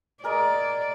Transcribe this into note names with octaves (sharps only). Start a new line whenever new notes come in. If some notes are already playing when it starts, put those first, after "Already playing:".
G#4 A#4 D5 D#5